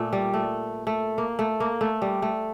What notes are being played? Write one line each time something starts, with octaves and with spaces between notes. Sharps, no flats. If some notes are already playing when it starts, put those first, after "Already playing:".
Already playing: A#2 A3
G3
A3
A3
A#3
A3
A#3
A3
G3
A3